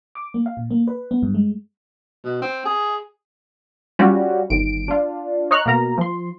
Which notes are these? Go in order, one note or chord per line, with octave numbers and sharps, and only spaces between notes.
D6
A#3
F5
A#2
A#3
B4
B3
G2
G#3
B2
C4
G#4
G3 C#4 F4 F#4
G1 D#3 D7
D4 F4
C#5 D#5 A#5 C#6 F6 F#6
B2 A#3 A#4 A#5
F3 C6